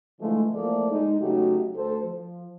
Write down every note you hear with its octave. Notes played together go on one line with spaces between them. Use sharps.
D3 E3 F3 G#3 A3
E2 F3 A3 A#3 A4 D5
G#3 D#4
C#3 F#3 A3 D#4 F#4 G4
D2 A4 C5
F3